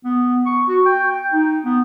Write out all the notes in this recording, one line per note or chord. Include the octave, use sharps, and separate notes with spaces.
B3
C#6
F#4
G5
G5
D#4
B3